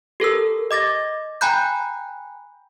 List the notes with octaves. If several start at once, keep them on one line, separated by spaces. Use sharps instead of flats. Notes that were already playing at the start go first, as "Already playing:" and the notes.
G4 A4 A#4 E6
D#5 D6 A6 A#6
G5 G#5 A#5 B5 F#6 G6